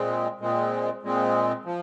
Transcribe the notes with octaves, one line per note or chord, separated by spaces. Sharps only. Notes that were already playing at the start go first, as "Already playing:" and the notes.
Already playing: A#2 G#3 C4
A#2 G#3 C4
A#2 G#3 C4
F3